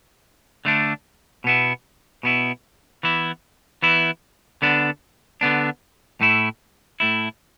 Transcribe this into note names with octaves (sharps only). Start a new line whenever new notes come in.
D3 A3 D4
B2 B3 E4
B2 B3 E4
E3 B3 E4
E3 B3 E4
D3 B3 D4
D3 B3 D4
A2 A3 E4
A2 A3 E4